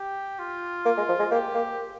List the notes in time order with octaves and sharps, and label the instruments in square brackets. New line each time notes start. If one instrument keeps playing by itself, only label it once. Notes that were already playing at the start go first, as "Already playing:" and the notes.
Already playing: [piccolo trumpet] G4
F4
[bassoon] A#3
G#3
F3
G#3
[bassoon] A#3 [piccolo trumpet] G4
[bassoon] A#3